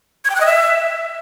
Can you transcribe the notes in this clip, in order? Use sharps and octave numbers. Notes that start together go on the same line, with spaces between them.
G#6
G5
F#6
D#5
E5